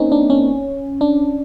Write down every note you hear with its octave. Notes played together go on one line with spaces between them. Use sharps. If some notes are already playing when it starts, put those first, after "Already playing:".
Already playing: A#3 C4 C#4 D#4
D4
C#4
D4